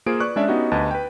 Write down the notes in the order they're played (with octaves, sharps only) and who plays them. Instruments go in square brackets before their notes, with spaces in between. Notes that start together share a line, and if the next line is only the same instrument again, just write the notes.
[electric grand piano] A#3 F4 G#4 C5 D7
B4 D5 C#6 F#6
G#3 C#4 D4 D5 E5
B3 C#4 D#4 F#4 G4 D#5
D2 G4 B4 D#5 A5
B4 G5